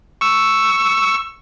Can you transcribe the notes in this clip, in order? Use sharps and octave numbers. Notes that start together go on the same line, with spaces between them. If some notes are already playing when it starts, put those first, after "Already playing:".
C#6 E6